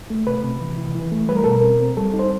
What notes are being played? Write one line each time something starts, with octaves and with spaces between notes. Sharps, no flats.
A3
C3 B4
C3
E3
E3
E3
A3
G3 B4
A#4
B2 A4
A#4
C4
C4
G3 A4
D#4
C5